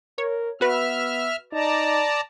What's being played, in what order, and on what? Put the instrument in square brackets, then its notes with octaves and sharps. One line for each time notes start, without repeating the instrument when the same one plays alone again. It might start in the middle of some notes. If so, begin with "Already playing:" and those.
[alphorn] A#4 [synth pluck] C#5
[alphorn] B3 [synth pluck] F#4 B4 [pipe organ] E5 F6
[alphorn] D#4 [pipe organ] D5 A5 A#5